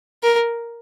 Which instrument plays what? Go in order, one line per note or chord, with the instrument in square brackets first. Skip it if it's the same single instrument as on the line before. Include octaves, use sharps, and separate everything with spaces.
[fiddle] A#4